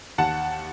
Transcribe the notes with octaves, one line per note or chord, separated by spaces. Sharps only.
D#2 F#5 A5